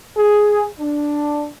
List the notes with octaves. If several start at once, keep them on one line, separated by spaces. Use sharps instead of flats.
G#4
D4